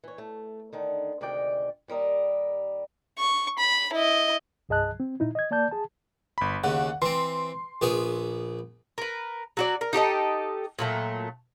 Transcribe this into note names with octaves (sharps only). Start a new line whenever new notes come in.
E3 C#5
A3
D3 D#3 D#4
D2 C3 D#3 G#3 D5 G5
D#2 G3 A#4 D#5
C#6
B5
E4 D#5
C2 G2 G#4 D#5 A5 F#6
C4
A#2 D#4 E4
D#5 G#6
A#3 D5 A5 G6
G#4 A5
G1 B5
D#2 C#3 F#5
E3 C4 C6
A#1 B3 G#4
A#4 B4
F#3 F#4 D5
A#4
D#4 G4 A4 D#5
A#2 F#3 A3